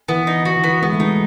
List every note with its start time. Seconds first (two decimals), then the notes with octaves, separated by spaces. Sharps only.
0.08 E3 B3
0.27 D#4
0.45 F#3 F#4
0.56 E3
0.64 F#3 B3
0.82 G#3 B3
0.92 A3
1.00 G#3 D#4